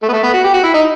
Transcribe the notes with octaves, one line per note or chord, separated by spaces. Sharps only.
A3
B3
A3
B3
F#4
G4
F#4
E4
D#4